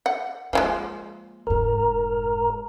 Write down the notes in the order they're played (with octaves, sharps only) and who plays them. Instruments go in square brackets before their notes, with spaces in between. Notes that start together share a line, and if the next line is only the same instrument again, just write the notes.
[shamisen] F#5
[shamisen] F3 F#3 G#3 [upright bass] A#3
[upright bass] F1 G#2 [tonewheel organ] A#4